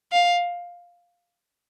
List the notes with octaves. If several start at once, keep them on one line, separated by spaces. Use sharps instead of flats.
F5